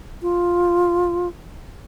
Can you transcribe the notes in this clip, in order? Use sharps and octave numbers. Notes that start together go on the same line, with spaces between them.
F4